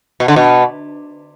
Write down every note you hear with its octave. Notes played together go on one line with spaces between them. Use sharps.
B2
D3
B2